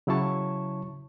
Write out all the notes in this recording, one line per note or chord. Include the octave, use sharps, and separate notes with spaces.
C#3 F#3 E4 C#5 A5 C#6